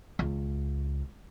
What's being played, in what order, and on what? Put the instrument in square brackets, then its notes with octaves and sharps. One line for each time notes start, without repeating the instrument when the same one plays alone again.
[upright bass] C#2